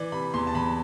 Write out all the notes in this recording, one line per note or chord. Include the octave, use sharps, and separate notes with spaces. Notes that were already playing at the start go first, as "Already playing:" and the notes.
Already playing: E3 D5
C3 B5
E2 C6
A5
E2 B5